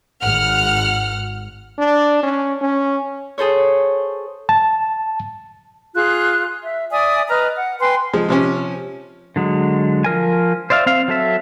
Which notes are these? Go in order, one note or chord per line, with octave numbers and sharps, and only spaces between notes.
G#1 F#5 F6
D4
C#4
C#4
G#4 A4 C5 C#5
A5
F4 G#4 F#6
E5
D5 E5 G#5 D#6
B4 D#5 A#5 F6
F#5
B4 G5 G#5 C6
F3 G#3
C3 F3 C#4
D3 F#3 G#3
F3 A#4 G#5
C5 D5 E5 F5
C4 F5
F#3 A4 E5